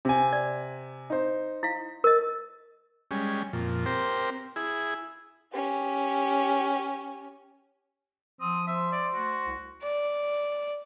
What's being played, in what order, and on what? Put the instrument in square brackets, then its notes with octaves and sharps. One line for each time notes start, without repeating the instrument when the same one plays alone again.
[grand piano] C3 G#5
[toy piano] D5
[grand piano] D#4 C5
[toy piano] E4 F5
A#4 D#5
[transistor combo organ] G3 G#3 C#4
F2 A#2
C4 G4 A#4 C5
E4 G#4
[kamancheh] C#4 G4
[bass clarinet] F3 [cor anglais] C4 [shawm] D#6
[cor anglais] C5 [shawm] E5
[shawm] D5
[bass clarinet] A3 [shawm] F#4
[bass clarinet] C2
[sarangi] D5